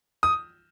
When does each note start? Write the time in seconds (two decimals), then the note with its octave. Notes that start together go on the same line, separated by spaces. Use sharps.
0.23 D#6